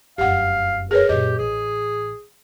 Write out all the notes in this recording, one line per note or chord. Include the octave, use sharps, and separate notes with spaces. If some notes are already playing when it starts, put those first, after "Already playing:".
F1 F#2 G4 F5 F#5
G#4 A#4 B4 C#5
F#2 A#2 G4 D#5
A1 G#4